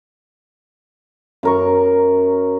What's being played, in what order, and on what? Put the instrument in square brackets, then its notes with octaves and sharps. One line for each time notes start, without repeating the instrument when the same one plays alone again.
[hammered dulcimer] F#2 A#4 C#6